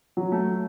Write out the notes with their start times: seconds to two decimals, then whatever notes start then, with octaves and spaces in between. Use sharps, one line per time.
0.17 F#3
0.32 A3